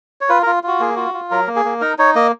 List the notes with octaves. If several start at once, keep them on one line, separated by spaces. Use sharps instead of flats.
C#5
F4 B4
F4 A#4
F4 F#4
A#3 G#4
F4 F#4
F4
F#3 A#4
A#3
G#4
A#3
D#4 A#4
D#4 C#5
A#3 D#5